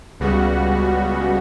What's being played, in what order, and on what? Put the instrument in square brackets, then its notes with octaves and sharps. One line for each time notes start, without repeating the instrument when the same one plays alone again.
[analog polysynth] C#2 C#3 G3 B3 F#4